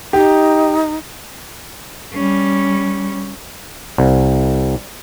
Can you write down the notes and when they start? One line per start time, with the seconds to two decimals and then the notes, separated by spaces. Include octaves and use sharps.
0.13 D#4 G4
2.14 G3 C#4
3.98 C2